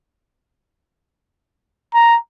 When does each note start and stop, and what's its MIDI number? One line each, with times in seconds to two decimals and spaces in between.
1.94 2.17 82